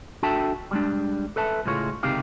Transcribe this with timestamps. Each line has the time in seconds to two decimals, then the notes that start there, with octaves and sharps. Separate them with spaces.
0.23 D4 F#4 A4 E5 G5 A5
0.71 G3 G#3 D4
1.36 A4 B4 E5 A5
1.65 C#2 A2 G#3 F4 C#5
2.03 C#2 C3 D#3 G4 F5